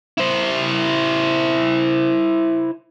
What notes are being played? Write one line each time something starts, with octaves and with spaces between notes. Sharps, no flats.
E4 C5